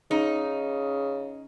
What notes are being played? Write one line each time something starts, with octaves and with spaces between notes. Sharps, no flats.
C#3 D#4